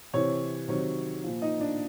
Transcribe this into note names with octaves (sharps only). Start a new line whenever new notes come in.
C3 E3 C#5
C3 D#3 F#3 C#5
A#2 F3
D#4 D#5
D4 D5